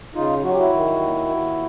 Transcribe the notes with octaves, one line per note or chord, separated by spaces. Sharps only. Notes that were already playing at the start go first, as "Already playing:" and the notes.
C#3 D#4 F4
F#3 F#4
G4
E4 F#4
D#3
D#2
D#2